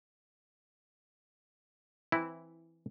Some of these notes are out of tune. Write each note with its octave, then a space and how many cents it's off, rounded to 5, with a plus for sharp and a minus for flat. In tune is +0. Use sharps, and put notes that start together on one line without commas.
E3 +5 C4 +0 E4 -5